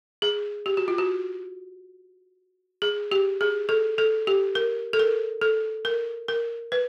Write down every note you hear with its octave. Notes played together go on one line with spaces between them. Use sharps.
G#4
G4
F#4
F4
F#4
G#4
G4
G#4
A4
A4
G4
A#4
A4
A#4
A4
A#4
A#4
B4